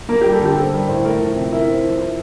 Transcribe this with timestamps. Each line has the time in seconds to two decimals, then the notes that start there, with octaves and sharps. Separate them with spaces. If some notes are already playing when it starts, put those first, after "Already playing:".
0.09 A#3 A#4
0.21 G3 G4
0.33 A4
0.41 D3 G4
0.56 C4 A4
0.72 G3 A#4
0.88 A2 C5
1.05 A3 A#4
1.20 F3
1.36 C3
1.53 E4 A#4
1.68 C4
1.84 F3
2.00 E4